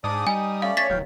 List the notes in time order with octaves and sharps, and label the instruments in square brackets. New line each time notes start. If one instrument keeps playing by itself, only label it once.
[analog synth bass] G#2 [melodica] D4 D5 D6 [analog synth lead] D#6
[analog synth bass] G3 [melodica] D#4 [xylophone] G#5
[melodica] A3 C#4 D5 [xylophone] F5
[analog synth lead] C#5 [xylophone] A6 B6
[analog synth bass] D1 [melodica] F5 G5